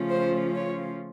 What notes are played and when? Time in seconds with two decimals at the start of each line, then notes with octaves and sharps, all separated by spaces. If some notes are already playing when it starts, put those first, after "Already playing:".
Already playing: C#3 F3 A3 C#4 F4
0.10 C5
0.55 C#5